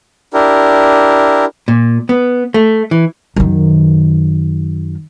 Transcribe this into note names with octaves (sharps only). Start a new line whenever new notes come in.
D4 E4 G4 A#4
A#2
B3
A3
E3
F#2 D#3